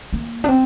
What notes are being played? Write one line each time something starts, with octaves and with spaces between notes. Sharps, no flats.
A#3
D4
C4